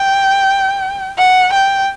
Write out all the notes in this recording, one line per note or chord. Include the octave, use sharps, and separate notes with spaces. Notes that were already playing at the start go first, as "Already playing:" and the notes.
Already playing: G5
F#5
G5